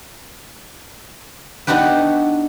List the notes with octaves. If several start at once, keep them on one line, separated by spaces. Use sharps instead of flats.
B3 D4 D#4 F#4 G4 B4